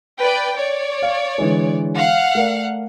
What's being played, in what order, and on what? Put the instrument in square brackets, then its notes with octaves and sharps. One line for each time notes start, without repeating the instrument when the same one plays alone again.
[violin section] B4 D5 G5
C#5 D5
[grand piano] F5
D3 E3 G#3
[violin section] F5 F#5
[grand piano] A3 A#4 D5